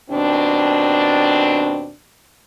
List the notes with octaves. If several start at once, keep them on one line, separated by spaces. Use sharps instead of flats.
D#2 B2 C4 D4